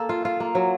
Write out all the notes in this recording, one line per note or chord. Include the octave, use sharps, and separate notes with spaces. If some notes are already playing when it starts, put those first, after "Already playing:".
Already playing: A#3 A4
F4
F4
A#3
F#3